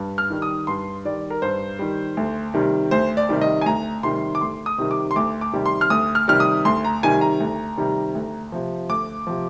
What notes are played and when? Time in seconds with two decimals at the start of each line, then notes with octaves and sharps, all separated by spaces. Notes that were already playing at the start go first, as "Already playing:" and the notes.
Already playing: G2
0.18 F6
0.30 D#3 G3
0.42 D#6
0.67 G2 C6
1.05 D#3 G3 D5
1.30 A#4
1.42 G2 C5
1.79 D#3 G3
2.17 D2
2.54 C3 D#3 G3
2.91 D2 C5
3.17 D5
3.29 C3 D#3 G3
3.41 D#5
3.61 G#5
3.66 D2 A#5
4.03 C3 D#3 G3 C6
4.35 D6
4.41 D2 C6
4.66 D#6
4.78 C3 D#3 G3
4.91 D6
5.11 C6
5.16 D2 D6
5.41 D6
5.53 C3 D#3 G3
5.66 C6
5.81 F6
5.90 D2 D#6
6.15 F6
6.28 C3 D#3 G3 F6
6.40 D#6
6.65 D2 C6
6.84 A#5
7.03 C3 D#3 G3 G#5
7.21 A#5
7.40 D2
7.77 C3 D#3 G3
8.15 D2
8.52 C3 F3
8.89 D2 D6
9.27 C3 F3